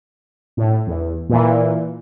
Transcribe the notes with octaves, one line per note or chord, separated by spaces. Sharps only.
A2
E2
A#2 E3